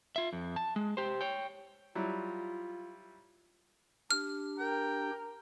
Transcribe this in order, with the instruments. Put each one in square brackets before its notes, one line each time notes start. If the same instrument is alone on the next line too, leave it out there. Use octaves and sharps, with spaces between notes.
[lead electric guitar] F4 E5
F2
A5
G#3
G4 C5
C#5 G5
[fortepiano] F#3 G3 E4 [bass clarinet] F4
[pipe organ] D4 G4 [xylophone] F6
[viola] A#4 [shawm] G5